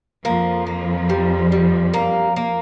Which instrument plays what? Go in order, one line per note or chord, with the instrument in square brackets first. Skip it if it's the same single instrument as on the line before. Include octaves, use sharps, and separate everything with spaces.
[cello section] F2 F3 [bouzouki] A#3
[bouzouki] A#3
G3
G3
A#3
A#3